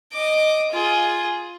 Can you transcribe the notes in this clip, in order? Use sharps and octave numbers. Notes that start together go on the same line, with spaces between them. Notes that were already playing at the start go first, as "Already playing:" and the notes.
D#5 D6
F4 G#4